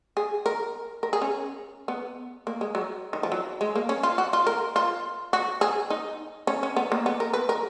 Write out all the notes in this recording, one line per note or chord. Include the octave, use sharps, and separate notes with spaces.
G#4
A#4
A#4
G#4
C#4
B3
A#3
G#3
F#3
D#3
F3
F#3
G#3
A#3
C#4
F4
F#4
F4
A#4
F4
F#4
G#4
D#4
C#4
C#4
B3
A#3
B3
A#4
B4
A#4